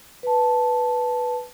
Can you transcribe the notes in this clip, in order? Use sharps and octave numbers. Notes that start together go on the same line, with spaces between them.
B4 A5